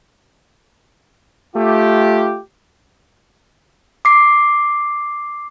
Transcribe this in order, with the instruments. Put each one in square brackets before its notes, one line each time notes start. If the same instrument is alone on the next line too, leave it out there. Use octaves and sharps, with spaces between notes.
[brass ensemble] A3 F4 G4
[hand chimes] D6 C7